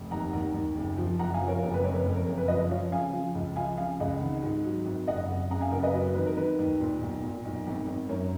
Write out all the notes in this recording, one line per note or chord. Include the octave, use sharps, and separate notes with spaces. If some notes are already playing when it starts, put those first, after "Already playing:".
Already playing: F1
D#2 F#5 A#5
D#2
D#2
F#1
F3
F#1 F#5 A#5
F5 G#5
F3
A#4 C#5
F#1 A#4
B4
F2 A#4 C#5
B4
F2
A#4 C#5
F#1
B4
F3 B4 D#5
F3 C#5 F5
C#3 F5 G#5
F3
C#2
F3 F5 G#5
C#3 F5 G#5
C#2 D#5 F#5
D#3
G#2
F#3
G#1
F#1 D#5 F#5
F#1
C#3 F#5 A#5
F5 G#5
F#1 A#4
B4 D#5
F#3 B4
B4
D#3 B4
A#4
D#3 B4
D#2
A#2
B1
A#2
B1
G#1
G#1
F#2 A#4 C#5